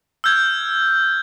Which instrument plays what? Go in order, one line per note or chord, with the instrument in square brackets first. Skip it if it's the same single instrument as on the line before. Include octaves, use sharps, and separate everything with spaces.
[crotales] E6 F6 G6 G#6